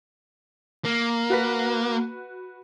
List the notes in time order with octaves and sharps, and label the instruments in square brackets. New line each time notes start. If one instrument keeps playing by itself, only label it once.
[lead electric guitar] A#3
[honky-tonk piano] F#4 B4 B6